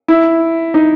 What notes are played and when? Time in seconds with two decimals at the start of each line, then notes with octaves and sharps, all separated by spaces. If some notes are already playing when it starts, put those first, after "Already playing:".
0.08 E4
0.74 D#4